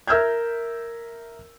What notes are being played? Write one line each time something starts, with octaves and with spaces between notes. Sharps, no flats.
A#4 E5 E6 F6 G6 G#6